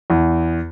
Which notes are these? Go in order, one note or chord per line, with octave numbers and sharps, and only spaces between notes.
E2